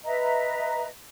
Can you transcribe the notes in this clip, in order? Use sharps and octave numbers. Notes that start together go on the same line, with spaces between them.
B4 D#5 E5 A#5